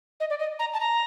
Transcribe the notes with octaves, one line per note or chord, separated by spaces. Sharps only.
D#5
D5
D#5
A#5
A5
A#5